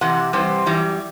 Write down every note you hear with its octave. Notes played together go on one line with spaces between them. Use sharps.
C3 E3 F#5
C3 E3 G3 C4
F#2 E3 G3